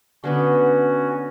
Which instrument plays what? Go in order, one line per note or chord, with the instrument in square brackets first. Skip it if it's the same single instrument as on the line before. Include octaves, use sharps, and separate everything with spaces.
[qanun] D3 B3 B4 [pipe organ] C#4 F#4